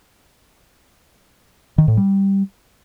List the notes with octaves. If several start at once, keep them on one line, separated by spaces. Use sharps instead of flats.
D#3
A2
G3